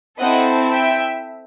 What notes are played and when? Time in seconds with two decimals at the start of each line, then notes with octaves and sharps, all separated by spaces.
0.19 C4 E4 A4 D#5 F#5
0.71 E5 G5